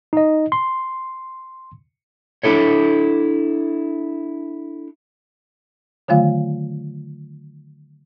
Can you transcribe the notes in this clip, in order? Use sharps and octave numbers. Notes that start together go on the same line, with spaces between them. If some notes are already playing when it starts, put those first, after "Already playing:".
D#4 D#5
C6
D4 E4 A4 C#5
D3 D#3 F#3 A3 F4 F5